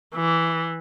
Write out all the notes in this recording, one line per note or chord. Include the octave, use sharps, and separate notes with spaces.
E3